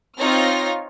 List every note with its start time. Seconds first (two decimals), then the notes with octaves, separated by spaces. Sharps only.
0.18 C4 D#4 F4 C#5 F6 A#6